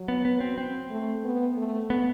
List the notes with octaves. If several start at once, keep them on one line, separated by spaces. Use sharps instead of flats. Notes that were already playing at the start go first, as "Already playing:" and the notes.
Already playing: F#3
B3
B3
C4
C4
A3
B3
A3
B3